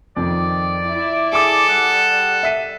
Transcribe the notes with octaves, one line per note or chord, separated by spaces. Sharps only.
F2 D#3 D5
E4
G#4 A4 D6
G3 F#5
E5 B6 D#7